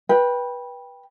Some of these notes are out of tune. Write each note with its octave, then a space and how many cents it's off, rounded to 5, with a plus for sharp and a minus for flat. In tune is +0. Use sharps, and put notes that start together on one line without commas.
B4 -20 G5 +10